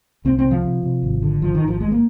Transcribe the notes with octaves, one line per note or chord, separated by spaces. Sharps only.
C2 C4
C4
C3
F3
C3
C3
G#1
D3
G#1 F3
D#3
G#1
F3
G#2 G#3
A#3